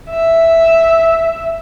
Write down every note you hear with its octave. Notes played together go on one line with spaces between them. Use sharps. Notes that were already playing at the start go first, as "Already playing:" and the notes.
E5